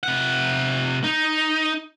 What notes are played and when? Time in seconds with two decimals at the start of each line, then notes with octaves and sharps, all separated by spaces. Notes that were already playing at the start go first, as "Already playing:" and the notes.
0.03 C3 F#5
1.04 D#4